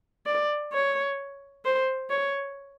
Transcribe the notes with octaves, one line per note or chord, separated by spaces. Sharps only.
D5
C#5
C5
C#5